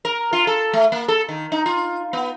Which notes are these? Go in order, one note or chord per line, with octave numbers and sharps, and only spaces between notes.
A#4
F4
A4
A3
A#3
A4
D#3
D#4
F4
B3